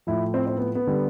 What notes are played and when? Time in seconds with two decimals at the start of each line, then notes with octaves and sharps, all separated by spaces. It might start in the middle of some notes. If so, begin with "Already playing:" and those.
0.07 A2 F3 E4
0.34 C4
0.47 C4
0.57 B3
0.75 B3
0.87 D3 G3